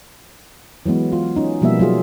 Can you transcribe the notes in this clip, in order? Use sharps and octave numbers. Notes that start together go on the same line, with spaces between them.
E3 F#3 G#3 B3
F4
C#4 D#4
B2 F3 G3 A#3 B3 E5
F#3 F4 G#4